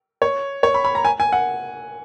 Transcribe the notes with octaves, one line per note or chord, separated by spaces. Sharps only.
C#5
C#5
B5
B5
A#5
G#5
G#5
F#5